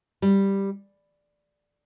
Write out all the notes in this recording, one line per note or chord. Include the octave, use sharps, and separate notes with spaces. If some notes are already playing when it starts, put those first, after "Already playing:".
G3